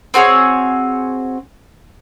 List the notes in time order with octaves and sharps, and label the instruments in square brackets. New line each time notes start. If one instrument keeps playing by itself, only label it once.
[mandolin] C4 F#4 G#4 C#5